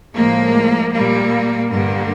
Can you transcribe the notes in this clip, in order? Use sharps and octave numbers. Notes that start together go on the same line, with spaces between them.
A2 F3 G#3 A#3
A#2 G3 A#3
G2 D3 G3 A#3